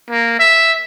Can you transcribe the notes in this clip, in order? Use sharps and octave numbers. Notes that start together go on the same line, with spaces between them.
A#3
E5